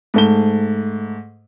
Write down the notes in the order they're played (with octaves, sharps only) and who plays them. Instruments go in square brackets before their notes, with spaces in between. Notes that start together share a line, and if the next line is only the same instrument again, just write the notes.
[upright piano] G#2 A3 G7